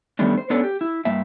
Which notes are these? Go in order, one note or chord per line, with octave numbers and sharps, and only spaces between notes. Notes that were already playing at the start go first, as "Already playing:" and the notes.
D#3 G3 A3 B3 C#4 D4
C5
B3 C#4 D4 A4 B4 C#5
G4
E4
G2 A#3 E5